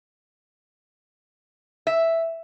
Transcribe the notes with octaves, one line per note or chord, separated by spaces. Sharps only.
E5